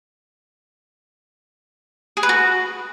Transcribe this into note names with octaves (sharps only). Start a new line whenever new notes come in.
G#4
B4
F#4